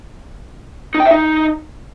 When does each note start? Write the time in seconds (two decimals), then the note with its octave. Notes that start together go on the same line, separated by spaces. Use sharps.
0.94 D#4
1.00 G5
1.05 E5
1.11 D#4